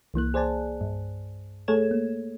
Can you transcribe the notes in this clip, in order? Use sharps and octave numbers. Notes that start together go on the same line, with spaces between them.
C2 E3 A#3 F#6
G#4 C5 D5 G#5 A5
G2
A3 G#4 A4 C#5 G#6 E7
A#3